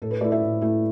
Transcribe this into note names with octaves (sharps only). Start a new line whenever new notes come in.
A2 A4
B4
A3 E4 A4 D5
B4 E5
A2
A3 E4